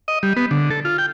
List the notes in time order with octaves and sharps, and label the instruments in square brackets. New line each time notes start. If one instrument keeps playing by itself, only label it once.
[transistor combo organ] D#5
G3
B3
D3
A4
F4
G5